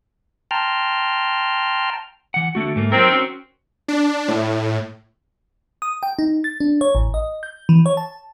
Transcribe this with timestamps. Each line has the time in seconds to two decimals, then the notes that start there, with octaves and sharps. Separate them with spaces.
0.51 G5 A5 A#5 C6 F6
2.34 E3 F#5
2.55 D3 A3 F#4
2.76 G#2 A3 A#3
2.92 D#3 F#3 C4 A#4
3.10 C#4 F#4
3.88 D4
4.28 A2
5.82 D#6
6.03 G5
6.19 D#4
6.44 A6
6.60 D4
6.81 C#5
6.95 A1
7.14 D#5
7.43 G6
7.69 E3
7.86 C#5
7.97 A5